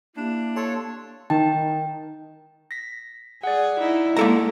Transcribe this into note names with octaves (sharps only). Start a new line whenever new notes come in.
A#3 D4 E4 G4
A4 C#5 A5 C6
D#3 D#4 G5 A5
A#6 B6
G#4 D5 F#5
D#4 E4
G#3 A#3 A4 A#5